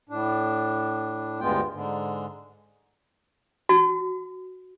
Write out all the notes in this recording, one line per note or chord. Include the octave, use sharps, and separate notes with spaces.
A2 D4
D2 G2 G#3 B3 F4 G5
G#2 D3
F#4